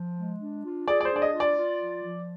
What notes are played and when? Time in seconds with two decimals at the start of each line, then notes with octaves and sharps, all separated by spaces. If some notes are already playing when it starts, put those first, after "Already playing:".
Already playing: F3
0.16 G#3
0.40 D4
0.63 F4
0.88 G#4 D5
1.01 D5
1.05 C5
1.11 D4
1.16 D5
1.22 D#5
1.34 F4
1.40 D5
1.57 F4
1.80 F3
2.04 F3